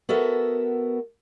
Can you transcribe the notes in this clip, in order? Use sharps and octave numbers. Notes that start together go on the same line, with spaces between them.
B3 F#4 A4 A#4 E5